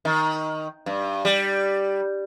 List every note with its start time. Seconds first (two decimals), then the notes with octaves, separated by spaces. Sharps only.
0.05 D#3
0.86 G2
1.25 G3